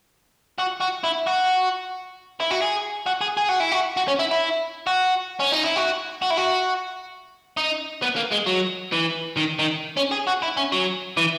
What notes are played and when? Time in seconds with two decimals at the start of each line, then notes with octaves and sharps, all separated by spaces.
0.59 F#4
0.81 F#4
1.04 E4
1.27 F#4
2.40 E4
2.51 F#4
2.62 G#4
3.06 F#4
3.21 G#4
3.37 G#4
3.49 F#4
3.60 E4
3.72 F#4
3.97 F#4
4.08 C#4
4.19 E4
4.31 E4
4.87 F#4
5.40 C#4
5.53 D#4
5.65 E4
5.77 F#4
6.22 F#4
6.30 E4
6.37 F#4
7.57 D#4
8.02 B3
8.17 A#3
8.32 G#3
8.47 F#3
8.92 E3
9.37 D#3
9.59 D#3
9.97 C#4
10.11 G#4
10.27 F#4
10.42 E4
10.57 C#4
10.72 F#3
11.17 E3